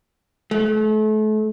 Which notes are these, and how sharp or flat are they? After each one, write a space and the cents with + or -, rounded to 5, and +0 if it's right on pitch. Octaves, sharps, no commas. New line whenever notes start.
A3 -35